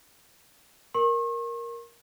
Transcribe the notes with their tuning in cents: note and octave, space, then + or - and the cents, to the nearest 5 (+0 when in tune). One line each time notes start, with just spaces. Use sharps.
A#4 +5 C#6 -45